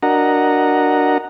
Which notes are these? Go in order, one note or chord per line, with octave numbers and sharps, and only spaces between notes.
D4 F#4 A#4 D#5 F#5 A#5